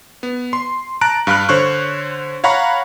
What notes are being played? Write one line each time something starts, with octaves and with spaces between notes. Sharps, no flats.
B3
C6
A5 A#5 F#6 D7
G2 F5 B5 F6 F#6
D3 C5 C#5 C#6 F#6
C#5 F5 F#5 A#5 B5 C#6